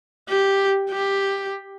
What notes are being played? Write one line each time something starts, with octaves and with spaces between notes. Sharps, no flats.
G4
G4